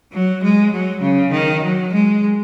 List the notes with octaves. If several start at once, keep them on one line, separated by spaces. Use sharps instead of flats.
F#3
G#3
F#3
C#3
D#3
F#3
G#3